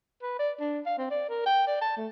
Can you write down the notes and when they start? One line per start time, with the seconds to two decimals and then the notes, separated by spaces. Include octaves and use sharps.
0.22 B4
0.39 D5
0.60 D4
0.86 F5
0.98 C4
1.11 D5
1.29 A#4
1.46 G5
1.67 D5
1.81 A5
1.97 A3